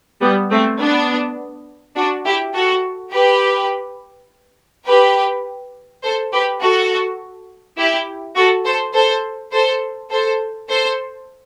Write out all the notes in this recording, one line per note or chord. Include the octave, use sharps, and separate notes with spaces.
G3 B3
A3 C4
B3 D4
D4 F#4
E4 G4
F#4 A4
G4 B4
G4 B4
A4 C5
G4 B4
F#4 A4
E4 G4
F#4 A4
A4 C5
A4 C5
A4 C5
A4 C5
A4 C5